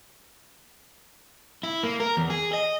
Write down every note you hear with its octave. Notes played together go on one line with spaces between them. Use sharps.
E4
A#3
A#4
E2
G#4
D#5